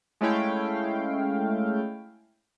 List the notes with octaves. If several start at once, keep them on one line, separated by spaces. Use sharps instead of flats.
G#3 A3 C#4 E4 F5 G5